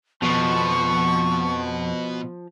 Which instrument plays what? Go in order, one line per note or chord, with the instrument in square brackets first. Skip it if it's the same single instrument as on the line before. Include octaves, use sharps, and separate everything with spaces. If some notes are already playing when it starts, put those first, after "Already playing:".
[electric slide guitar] F2 B3 [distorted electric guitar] B2 [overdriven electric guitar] F3 [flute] C#6